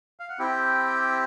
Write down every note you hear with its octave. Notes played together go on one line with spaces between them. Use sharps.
F5
F#5
C4 E4 G4 G5